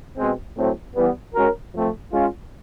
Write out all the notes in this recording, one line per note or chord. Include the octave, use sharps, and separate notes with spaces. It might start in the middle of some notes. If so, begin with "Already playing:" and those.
B2 G#3 C4
A2 F#3 A3 C4
E3 G3 B3
G#3 C#4 F#4 A#4
F3 A3 C4
G#3 C#4 F4